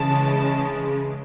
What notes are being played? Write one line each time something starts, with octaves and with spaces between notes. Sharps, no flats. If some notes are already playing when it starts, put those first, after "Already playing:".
Already playing: C#3 E3 G#3 A5